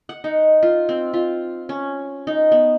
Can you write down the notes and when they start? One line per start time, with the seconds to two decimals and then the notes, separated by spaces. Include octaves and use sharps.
0.09 F#5
0.24 D#4
0.63 F4
0.89 C4
1.14 F4
1.69 C#4
2.27 D#4
2.52 B3